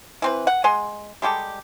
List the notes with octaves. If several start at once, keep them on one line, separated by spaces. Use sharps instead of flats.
E3 C4 B4
F#5
G#3 F#5 G#5 C6
G3 G#3 G4 A4